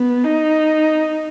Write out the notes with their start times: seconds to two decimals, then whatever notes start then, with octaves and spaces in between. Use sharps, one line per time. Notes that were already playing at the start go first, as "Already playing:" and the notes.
Already playing: B3
0.25 D#4